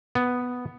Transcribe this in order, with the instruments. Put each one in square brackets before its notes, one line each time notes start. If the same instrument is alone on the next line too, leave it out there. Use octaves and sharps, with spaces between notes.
[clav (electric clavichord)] B3